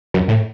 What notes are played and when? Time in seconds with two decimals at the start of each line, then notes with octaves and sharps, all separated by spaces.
0.14 F#2
0.28 A2